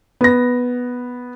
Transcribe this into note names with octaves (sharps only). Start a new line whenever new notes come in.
B3 A#6